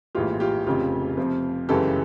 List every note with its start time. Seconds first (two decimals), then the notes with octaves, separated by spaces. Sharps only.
0.15 A#1 A2 E3 G#3 F4 G4
0.40 F4 G4
0.67 F1 F2 C#3 F4 G4
1.17 F2 C3 F3
1.69 G1 F#2 C#3 E3 G#3 G4 A4